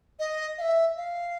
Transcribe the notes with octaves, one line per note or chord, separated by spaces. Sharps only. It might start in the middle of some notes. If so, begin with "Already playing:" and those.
D#5
F5
E5
F5